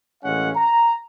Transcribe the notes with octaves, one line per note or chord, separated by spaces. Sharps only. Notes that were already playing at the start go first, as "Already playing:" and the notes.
A1 G#3 C#4 F5 F#5
A#5